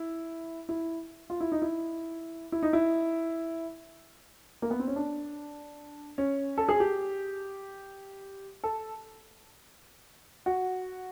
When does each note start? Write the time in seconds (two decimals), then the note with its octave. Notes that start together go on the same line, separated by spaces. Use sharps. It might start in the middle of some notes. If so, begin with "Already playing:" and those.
Already playing: E4
0.69 E4
1.30 F4
1.40 E4
1.52 D#4
1.62 E4
2.52 E4
2.63 D#4
2.73 E4
4.62 A#3
4.71 B3
4.79 C4
4.87 C#4
4.96 D4
6.18 C#4
6.58 A4
6.69 G#4
6.80 G4
8.64 A4
10.46 F#4